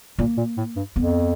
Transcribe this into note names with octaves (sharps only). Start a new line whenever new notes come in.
A#2 A#3
A#2
A2
G2
F2 B3